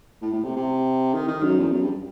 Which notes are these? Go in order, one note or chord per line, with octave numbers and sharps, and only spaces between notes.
A2
A2
C3
C3
D#3
D#3
F#2
E2
F#2
G2